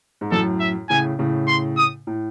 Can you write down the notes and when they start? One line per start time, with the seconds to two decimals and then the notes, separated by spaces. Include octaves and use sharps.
0.21 G#2
0.32 F#2 A2 A4
0.60 E5
0.89 A2 C#3 G#5
1.19 A2 C#3
1.48 C6
1.77 D#6
2.07 A2